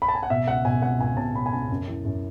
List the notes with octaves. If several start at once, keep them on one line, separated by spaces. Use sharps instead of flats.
B5
A5
G#5
F#5
B2 E5
C#2 F#5
B2 G#5
C#2 F#5
C#2 G#5
B2 A5
B2 B5
G#5
C#2 A5
F#2
E3
F#2